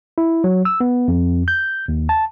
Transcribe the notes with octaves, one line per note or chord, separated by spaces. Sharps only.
E4
F#3
E6
B3
F2
G6
D#2
A5